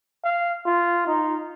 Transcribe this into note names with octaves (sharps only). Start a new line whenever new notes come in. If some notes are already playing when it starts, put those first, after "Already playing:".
F5
F4
D#4